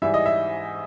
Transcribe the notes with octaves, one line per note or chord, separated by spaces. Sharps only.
G#2 E3 G3 E5
D#5
E5